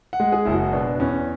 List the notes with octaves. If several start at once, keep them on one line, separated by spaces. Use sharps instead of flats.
F#5
G#3
G#4
F#1 E4
F#4
B2 D4
E2 C#4